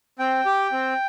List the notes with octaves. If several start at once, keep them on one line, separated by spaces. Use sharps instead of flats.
C4 G5
G4
C4